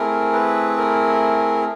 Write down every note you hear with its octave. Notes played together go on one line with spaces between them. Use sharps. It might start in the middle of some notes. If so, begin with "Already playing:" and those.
Already playing: A3 C4 E4 G#4 A#4
B4
A#4